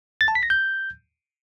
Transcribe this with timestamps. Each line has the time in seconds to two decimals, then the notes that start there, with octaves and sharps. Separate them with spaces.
0.21 A6
0.28 A5
0.35 B6
0.43 A#6
0.50 G6